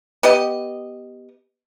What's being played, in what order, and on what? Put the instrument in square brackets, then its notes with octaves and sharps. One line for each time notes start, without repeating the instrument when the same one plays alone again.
[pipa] B3 G4 D#5